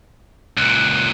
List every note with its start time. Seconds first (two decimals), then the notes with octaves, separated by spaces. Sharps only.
0.57 C#2 A#2 F#6